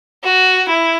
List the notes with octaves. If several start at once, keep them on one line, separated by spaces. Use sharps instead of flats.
F#4
E4